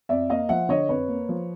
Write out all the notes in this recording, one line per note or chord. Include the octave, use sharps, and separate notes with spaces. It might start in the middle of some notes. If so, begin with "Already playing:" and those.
F2 D5 E5
A#3 D#5 F5
F3 E5 F#5
D3 C#5 D#5
F2 B4 C#5
A#3
F3